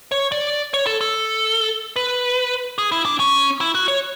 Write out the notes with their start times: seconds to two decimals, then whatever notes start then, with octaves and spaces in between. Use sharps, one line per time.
0.12 C#5
0.32 D5
0.74 C#5
0.86 A4
1.01 A4
1.96 B4
2.78 G#4
2.92 E4
3.05 D4
3.20 C#4
3.61 E4
3.75 F#4
3.88 C#5